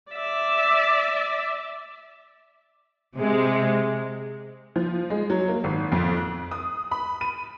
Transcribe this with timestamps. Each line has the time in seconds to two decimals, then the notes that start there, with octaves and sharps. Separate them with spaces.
0.11 D5 E5
3.18 C3 G#3
4.76 F3
5.10 G#3
5.30 F#3
5.48 A#3
5.64 G#1
5.92 F2
6.17 F#6
6.51 D#6
6.91 B5
7.21 D#7